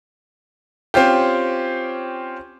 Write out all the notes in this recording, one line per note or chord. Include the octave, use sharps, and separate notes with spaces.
C4 C#4 F4 G4